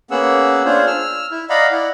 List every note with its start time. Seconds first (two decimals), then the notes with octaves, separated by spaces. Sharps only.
0.11 A#3 B3 C#4 G#4 F#5 E6
0.65 D4 F4 G#4 C5 C#5
0.87 E6 F6
1.31 E4
1.50 D5 D#5 F5 F#5 A#5 B5
1.72 E4 D5 F#5